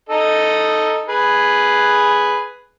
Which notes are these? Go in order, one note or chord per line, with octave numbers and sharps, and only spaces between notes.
D#4 A4 D#5
G#4 B4